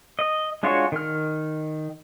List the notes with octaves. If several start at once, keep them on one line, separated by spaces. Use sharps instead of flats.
D#5
G#3 D4 F4 F#4 C#5
D#3 F6